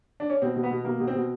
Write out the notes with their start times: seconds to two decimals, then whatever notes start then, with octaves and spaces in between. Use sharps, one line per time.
0.20 D4
0.30 C#4
0.42 B2 C4
0.56 B2
0.63 B3
0.71 B2
0.85 B2 A#3
1.00 B2
1.07 C4
1.15 B2